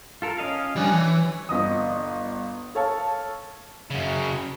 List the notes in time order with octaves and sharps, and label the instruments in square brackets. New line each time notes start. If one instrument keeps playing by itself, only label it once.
[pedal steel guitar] F4 A4 A#4
C#4 D#5 F5
[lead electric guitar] F3 G#5 [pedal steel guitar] G3 D4
[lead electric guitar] E3 [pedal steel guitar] C#5
[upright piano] G1 D#5 D#6
A4 C#5 F5 A5
[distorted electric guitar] F#2 C#3